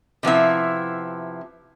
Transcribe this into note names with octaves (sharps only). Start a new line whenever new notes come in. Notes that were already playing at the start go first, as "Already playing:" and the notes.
C3 F3 B3 E4